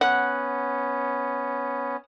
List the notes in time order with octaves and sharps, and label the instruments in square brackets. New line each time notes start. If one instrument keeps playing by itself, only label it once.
[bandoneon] B3 C#4 [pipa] F#5